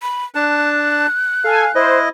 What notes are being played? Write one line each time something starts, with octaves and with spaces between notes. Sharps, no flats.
B5
D4 A5 F#6
A4 F5 G#5
E4 C5 D#5